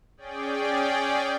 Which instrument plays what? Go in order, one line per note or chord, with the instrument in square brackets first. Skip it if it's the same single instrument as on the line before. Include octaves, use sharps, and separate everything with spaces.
[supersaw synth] C#4 G#4 D5 G5